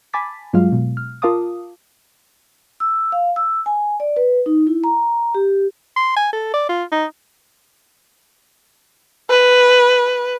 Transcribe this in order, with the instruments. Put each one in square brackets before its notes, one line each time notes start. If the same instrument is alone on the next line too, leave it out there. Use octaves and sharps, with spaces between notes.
[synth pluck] G#5 A5 B5 D6 A6 B6
G2 F#3 G#3 F4 F5
B2
F6
F4 A#4 F5 A5 D6 D#6
[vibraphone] E6
F5
E6
G#5
D5
B4
D#4
E4
A#5
G4
[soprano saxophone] C6
G#5
A4
D5
F4
D#4
[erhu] B4